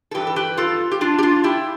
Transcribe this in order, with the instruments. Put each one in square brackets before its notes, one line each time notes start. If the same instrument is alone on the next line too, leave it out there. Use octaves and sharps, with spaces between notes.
[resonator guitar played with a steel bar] A4
G2 E3 G3 G4 B4
A4
G4 B4
F4 A4
G4
D4 F4
G4
D4 F4
E4 G4